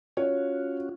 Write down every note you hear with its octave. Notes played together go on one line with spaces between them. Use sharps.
C#4 F4 F#4 C#5